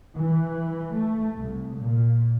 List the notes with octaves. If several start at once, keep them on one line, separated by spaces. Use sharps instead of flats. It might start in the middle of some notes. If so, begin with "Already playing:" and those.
E3
A3
C2
A#2